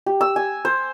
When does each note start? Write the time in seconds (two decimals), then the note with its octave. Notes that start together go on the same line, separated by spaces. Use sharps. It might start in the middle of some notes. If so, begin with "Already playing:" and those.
0.06 G4
0.21 E6
0.36 G#5
0.65 C5